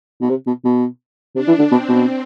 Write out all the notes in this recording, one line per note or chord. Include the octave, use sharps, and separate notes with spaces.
B2
C3
B2
B2
C3 D4
E3
D3
B2 C4
B2